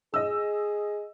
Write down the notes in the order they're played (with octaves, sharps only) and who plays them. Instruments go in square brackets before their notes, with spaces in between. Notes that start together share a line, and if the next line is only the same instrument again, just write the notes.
[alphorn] G#4 [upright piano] D#5 E6